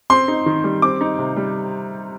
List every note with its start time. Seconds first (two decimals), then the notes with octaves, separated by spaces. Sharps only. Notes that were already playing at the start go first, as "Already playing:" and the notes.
0.10 C4 C6
0.28 D#4
0.46 D#3
0.64 G3
0.82 C4 D6
1.01 D#4
1.19 C3
1.37 G3